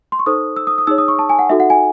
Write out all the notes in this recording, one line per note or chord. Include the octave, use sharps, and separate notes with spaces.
C6
C#6
D#4 A4 C5 D#6
E6
D#6
D#6
D#4 G#4 C#5 E6
D#6
C#6
A5
G#5
F#5
D#4 F#4 A4 E5
F#5
G#5